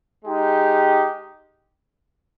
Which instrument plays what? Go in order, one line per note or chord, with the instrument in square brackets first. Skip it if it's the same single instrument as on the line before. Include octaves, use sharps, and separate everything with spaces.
[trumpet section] G#3 D#4 G4